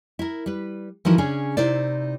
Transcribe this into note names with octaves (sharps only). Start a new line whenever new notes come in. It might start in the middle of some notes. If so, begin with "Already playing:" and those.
E4 A#4
G3 B4
E3 F3 D#4 E4 F#4 A#4
C#3 C#4 D4 G#4
C3 D#4 E4 C5 D5